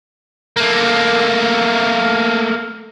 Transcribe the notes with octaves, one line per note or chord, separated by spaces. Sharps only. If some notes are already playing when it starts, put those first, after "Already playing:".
A3 A#3